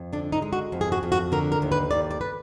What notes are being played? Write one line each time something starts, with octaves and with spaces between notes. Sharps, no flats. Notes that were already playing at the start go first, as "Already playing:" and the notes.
Already playing: F2
D3 D4
D#4
G#3
F#4
F2
G#4
F#4
F2
F#4
D3 A#4
A#4
D#2
B4
D#2 D5
D5
B4